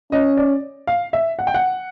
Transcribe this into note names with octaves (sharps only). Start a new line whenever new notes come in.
C#4 D#5
D5
F5
E5
F#5
G5
F#5